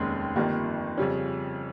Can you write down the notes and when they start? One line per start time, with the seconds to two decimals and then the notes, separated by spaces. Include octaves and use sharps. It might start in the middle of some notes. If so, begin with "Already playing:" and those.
Already playing: F1 D#2 D#3 G#3 C#4
0.36 G1 F2 D#3 G3 A#3
0.98 F2 C#3 G3 C#4